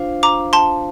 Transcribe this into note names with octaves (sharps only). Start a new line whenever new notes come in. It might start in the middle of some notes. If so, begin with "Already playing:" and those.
Already playing: D4 F4 C5 F5
A#5 D6
A5 C6